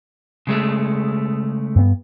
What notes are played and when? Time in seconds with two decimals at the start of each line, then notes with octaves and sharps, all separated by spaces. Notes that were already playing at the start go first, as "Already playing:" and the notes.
0.47 C#3 G#3 A3
1.76 G2 B3